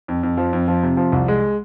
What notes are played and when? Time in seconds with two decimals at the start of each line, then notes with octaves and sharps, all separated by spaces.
0.08 F2
0.23 F2
0.37 F3
0.53 F2
0.68 F3
0.83 C3
0.97 F3
1.12 C2
1.28 G#3